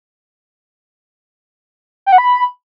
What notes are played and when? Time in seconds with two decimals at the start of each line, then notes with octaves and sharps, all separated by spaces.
2.06 G5
2.12 F#5
2.18 B5